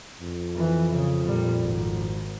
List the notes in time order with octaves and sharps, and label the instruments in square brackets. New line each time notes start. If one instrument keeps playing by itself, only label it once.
[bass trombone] F2
[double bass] E3
C#3
A#2 G3
G#1